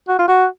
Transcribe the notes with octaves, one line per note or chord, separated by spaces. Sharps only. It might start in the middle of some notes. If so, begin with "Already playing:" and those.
F#4
F4
F#4